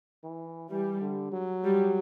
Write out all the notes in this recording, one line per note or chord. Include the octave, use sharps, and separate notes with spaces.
E3
E3 G3
D3
F#3
G3